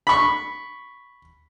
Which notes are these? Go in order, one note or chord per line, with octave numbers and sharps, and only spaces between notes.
B5 C#6